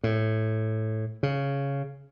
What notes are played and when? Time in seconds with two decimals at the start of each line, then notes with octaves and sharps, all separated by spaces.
0.04 A2
1.23 C#3